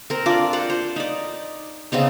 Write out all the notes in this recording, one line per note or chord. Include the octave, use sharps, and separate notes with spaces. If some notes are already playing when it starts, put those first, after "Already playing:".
C4 A#4
D4 F4 D5
C5 D5 F#5
C5
D#4 D5
C#3 B3 C4 D#4